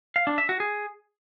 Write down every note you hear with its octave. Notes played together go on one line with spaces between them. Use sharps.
F5
D4
E5
F#4
G#4